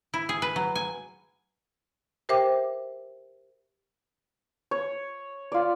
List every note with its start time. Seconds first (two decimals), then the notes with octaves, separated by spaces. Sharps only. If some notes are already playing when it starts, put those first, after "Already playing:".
0.14 E4
0.29 G#4
0.42 B4
0.56 F#3
0.76 G#5
2.29 G4 A#4 C5 E5 G5 D6
4.71 C#5
5.52 F4 D5